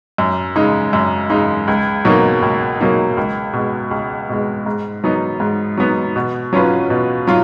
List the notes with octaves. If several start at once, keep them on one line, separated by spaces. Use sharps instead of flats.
F#2
C#3 G#3 D#4
F#2
C#3 G#3 D#4
C#2
B2 F#3 A#3 D#4
C#2
B2 F#3 A#3 D#4
C#2
B2 G#3
C#2
B2 G#3
G#2
F#3 B3 D#4
G#2
F#3 B3 D#4
B2
F#3 C#4 F4 B4
B2
F#3 F4